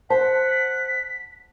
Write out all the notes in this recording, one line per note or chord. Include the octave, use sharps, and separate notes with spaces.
C5 F#5 A5 B6